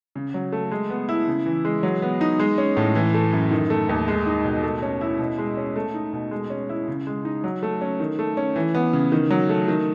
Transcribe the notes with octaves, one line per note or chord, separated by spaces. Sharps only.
C#3
F#3
A3
G#3
B3
E4
C#3
E3
G#3
F#3
B3
D#4
G#3
C#4
A2
E3
A3
F#2
D#3
A3
D#2
G#3
D#4
B2
A3
C#4
E4
B2
G#3
C#4
A3
D#4
B2
G#3
C#4
E4
C#3
G#3
D#4
F#3
A3
C#4
D#3
A3
C#4
E3
B3
C#3
D#3
F#3
A3
D#3